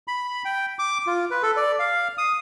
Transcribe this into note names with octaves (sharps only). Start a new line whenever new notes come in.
B5
G5
D6
F4
B4
A4
D5
F5
D#6